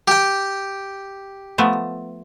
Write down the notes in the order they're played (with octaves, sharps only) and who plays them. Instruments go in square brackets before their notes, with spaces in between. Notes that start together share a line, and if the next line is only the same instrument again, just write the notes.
[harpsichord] G4 G5
[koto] F3 A3 B3